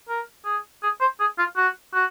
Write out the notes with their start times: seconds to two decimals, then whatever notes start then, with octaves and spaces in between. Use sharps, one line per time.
0.09 A#4
0.45 G#4
0.83 G#4
1.01 C5
1.20 G#4
1.38 F4
1.57 F#4
1.94 F#4